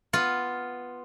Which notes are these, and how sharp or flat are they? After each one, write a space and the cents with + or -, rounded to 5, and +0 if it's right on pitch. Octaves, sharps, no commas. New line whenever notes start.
B3 +0 F4 +0